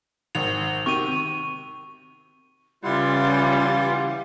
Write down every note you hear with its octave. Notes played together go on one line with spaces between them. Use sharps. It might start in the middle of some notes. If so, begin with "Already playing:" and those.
G#1 F7
C3 D#3 C#6 D#7
C#3 E3 G3 E4 F4 F#5 C6